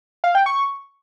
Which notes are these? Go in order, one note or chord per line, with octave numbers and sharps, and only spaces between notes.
F5
G5
C#6